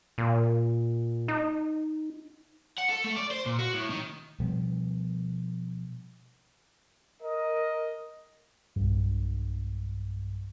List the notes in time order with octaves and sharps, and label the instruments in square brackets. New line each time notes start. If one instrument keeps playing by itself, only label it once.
[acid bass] A#2
D#4
[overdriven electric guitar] F#5
A4
A3
D5
C5
A#2
F#4
A2
D#3
[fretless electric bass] B2 F3 G3 B3
[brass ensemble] A#4 D#5
[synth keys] B1 G2